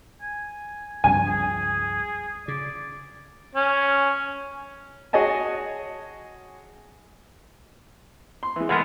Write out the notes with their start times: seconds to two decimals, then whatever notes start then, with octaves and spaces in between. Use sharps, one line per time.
0.22 G#5
1.04 C#2 G2 F3 G#5
1.27 G#4
2.48 C#3 D5
3.55 C#4
5.13 F#4 G#4 C#5 D#5 G#5 A5
8.43 C6
8.56 E3 G#3
8.69 E3 G#3 A3 B3 F4 A#4 F#5